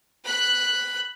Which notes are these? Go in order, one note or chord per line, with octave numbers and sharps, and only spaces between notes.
B5 F#6